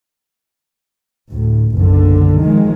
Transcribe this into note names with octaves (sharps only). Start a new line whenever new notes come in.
D2 A2
F#1 B1 D3
D#3 F3 G#3